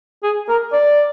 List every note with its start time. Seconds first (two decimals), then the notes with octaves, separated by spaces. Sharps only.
0.23 G#4
0.49 A#4
0.73 D5